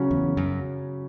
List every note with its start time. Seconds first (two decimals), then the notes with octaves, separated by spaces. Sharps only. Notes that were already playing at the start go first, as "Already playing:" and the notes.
Already playing: C#3 F#3 C#4 F#4
0.11 E2
0.37 F#2